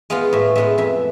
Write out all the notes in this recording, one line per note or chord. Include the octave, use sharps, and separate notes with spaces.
G#3 B3 F4 F5
A2 E5
G#3 B3 F4 E5
F2 E5